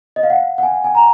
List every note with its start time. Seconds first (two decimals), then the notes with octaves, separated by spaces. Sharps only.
0.16 D#5
0.23 F5
0.30 F#5
0.58 F#5
0.63 G#5
0.84 G#5
0.95 A#5